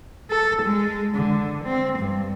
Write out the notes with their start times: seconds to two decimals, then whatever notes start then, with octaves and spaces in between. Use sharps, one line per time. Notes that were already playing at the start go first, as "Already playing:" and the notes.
0.30 A4
0.62 G#3
1.15 D3
1.64 C4
1.99 G2